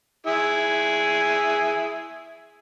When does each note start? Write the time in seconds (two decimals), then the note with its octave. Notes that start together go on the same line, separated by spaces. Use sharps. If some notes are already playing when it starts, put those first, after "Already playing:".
0.27 E4 G#4